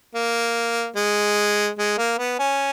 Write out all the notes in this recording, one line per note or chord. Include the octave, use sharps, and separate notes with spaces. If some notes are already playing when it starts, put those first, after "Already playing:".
A#3
G#3
G#3
A#3
B3
C#4